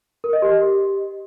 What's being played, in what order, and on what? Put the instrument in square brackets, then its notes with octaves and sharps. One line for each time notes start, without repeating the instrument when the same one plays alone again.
[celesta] A#4
D#5
G4